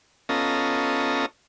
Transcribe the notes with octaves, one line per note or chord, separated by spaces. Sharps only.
B3 C#4 F4 A4 D#5 A#5